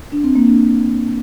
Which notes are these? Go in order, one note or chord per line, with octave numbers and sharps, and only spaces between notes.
D4
C4
A#3
D4